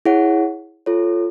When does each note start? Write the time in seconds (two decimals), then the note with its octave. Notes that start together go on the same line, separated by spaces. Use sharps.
0.05 E4 G#4 C#5 F#5
0.86 F4 A4 C#5